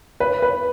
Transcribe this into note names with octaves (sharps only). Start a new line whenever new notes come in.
B4
B4